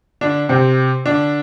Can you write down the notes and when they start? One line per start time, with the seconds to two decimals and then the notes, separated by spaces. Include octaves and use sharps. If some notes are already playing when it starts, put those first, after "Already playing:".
0.21 D3 D4
0.49 C3 C4
1.06 D3 D4